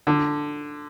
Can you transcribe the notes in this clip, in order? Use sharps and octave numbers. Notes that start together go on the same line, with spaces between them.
D3